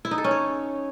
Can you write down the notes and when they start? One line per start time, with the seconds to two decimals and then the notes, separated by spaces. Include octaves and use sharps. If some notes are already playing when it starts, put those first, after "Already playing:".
0.05 E4
0.11 D#4
0.18 A4
0.24 C#4
0.31 C#5